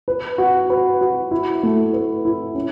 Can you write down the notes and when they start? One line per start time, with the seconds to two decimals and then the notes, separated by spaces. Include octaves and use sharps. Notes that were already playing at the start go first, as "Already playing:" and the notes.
0.08 B4
0.38 F#4
0.70 B4
1.01 F#4
1.31 E4
1.63 A3
1.93 B4
2.25 E4
2.55 C#4